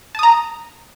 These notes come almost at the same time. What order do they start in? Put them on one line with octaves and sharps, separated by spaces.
A5 D#6 A#5